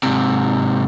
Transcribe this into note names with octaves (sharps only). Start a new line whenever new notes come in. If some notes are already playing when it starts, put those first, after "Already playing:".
G#2 C3